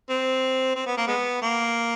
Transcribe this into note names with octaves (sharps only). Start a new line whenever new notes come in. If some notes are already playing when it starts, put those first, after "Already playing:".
C4
C4
B3
A#3
G#3 B3
A#3